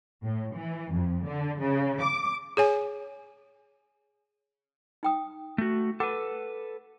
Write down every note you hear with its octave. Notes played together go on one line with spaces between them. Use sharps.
A2
E3
F2
D3
C#3
D6
G#4 C#5 G#5
D#4 G5 D#6
A3 F#4
A4 B4 F#5 D6